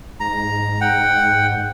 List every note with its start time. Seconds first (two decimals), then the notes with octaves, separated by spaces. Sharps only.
0.20 G#2 A#5
0.81 F#5 G5